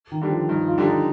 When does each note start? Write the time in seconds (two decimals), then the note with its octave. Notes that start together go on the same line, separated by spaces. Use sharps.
0.12 D#3
0.22 D3 G3 D4
0.30 F3
0.49 G2 D#4
0.68 F4
0.78 D3 G3 D4
0.87 D#4